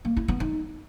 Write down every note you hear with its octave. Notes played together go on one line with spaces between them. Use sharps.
A#3
E4
B3
D#4